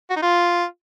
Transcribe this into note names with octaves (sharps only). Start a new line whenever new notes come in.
F#4
D#4
F4